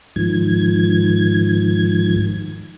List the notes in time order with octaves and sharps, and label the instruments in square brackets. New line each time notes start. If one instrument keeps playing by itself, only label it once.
[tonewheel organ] G#2 D#3 F3 G#6